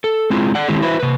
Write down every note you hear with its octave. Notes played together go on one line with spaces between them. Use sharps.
A4
G#3 C4 E4 F4
D5 F#5
D#3 G#3 C4 E4 G4
E4 F#4 B4 C5 E5
C3 B4